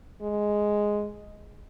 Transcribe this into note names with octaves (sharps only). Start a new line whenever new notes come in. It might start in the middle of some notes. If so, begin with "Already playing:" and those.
G#3